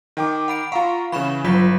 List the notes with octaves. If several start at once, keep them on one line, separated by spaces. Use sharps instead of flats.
D#3 G5 D6
F#5 B5 D7
F4 F5 F#5 A#5 C#6
C#3 E3 B5 C#6 E7
G1 F#3 F4 B6